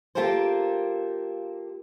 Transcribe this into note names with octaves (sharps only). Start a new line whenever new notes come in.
A#3 F4 G4 A4 A#4 C5